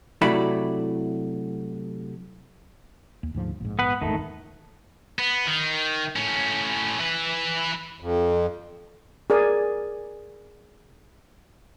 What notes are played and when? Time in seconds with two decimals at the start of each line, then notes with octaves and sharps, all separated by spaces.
0.21 C3 F#3 A3 E4 D5 B5
3.23 D#2
3.34 D2 G#2 F3
3.60 A#1 G#2
3.79 B3 B4
4.02 D#1 G#1 E2 D#3 A3
5.19 B3
5.47 D#3
6.16 A2 C#4
7.00 E3 B4
8.00 F2
9.30 G#4 A#4 D5 G#5